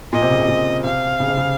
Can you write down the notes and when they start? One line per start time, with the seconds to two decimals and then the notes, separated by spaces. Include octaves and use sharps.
0.13 A#2 D#5
0.22 C3
0.31 C#3
0.40 C3
0.48 A#2
0.84 C3 F5
1.20 C#3
1.28 C3
1.37 C#3